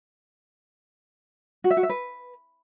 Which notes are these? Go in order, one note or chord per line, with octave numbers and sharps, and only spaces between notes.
F#4
E5
F#4
E5
B4